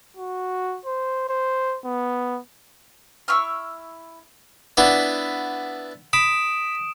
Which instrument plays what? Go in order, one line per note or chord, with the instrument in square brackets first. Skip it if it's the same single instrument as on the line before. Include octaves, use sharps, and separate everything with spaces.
[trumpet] F#4
C5
C5
B3
[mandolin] E4 C#6 E6 F6
[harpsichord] B3 D4 E4
[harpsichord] B5 [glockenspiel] D#6 D7 E7